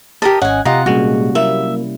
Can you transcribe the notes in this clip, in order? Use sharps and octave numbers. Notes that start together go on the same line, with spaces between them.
G4 A#4 D#5 A5
G#1 C#4 D#5 F#5 G#5
C3 F4 G4 D#5 F#5 A#5
A#2 G3 G#3 A#3 C#4 F#4
F#3 A#3 E4 E5